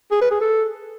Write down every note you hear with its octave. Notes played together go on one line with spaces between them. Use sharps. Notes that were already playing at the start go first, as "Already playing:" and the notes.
G#4
B4
G#4
A4